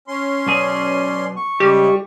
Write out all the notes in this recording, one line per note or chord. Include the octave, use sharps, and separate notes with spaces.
C#4 C6
B1 B2 G#4 D5
C#6
C#3 G3 G#3 G4